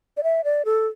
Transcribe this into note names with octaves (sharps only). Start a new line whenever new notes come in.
D5
E5
D5
A4